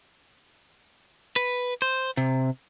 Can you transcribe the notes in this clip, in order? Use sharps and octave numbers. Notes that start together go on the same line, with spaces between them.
B4
C5
C3